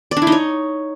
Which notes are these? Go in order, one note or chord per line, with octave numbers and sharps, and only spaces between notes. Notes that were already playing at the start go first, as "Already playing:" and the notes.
D5
D4
E4
D#4
C#5